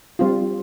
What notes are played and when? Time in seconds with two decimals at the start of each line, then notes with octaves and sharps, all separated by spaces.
0.19 G3 C4 F4